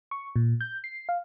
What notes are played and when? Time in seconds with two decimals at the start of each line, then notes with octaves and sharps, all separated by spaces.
0.11 C#6
0.36 A#2
0.61 G6
0.84 C7
1.09 F5